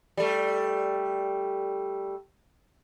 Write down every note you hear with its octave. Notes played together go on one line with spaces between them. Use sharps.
G3 A3